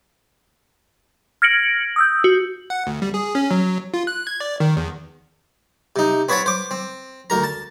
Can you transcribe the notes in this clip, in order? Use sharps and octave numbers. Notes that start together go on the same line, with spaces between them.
F6 G#6 A#6 C#7 D7 F#7
D#6 E6 G6
F#4
F#5
D2
G3
G#4
C#4
F#3
F4
F#6
G#6
D5
D#3
E2
C3 D#4
C4 B4 C#5 F#5 A5 B5
C5 D6
C4
D2 A#4 A#5
A5